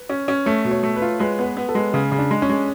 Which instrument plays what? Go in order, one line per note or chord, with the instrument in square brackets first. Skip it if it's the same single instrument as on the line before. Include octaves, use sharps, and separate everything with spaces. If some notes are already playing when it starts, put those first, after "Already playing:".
Already playing: [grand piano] B4
[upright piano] C#4
C#4
[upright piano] A3 [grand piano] C#5
[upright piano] B2
[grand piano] C#5
[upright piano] A3
[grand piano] B4
[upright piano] F4
[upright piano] G#3 [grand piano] B4
[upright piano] B3
[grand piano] B4
[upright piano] B3
[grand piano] A4
[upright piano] G#3
[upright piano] C#3 [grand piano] G#4
[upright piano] C#3
[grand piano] D4
[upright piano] G#3
[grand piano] C#4
[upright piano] G#3